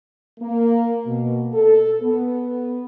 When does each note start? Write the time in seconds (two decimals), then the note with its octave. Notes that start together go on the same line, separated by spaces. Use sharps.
0.40 A#3
1.06 B2
1.53 A4
2.01 B3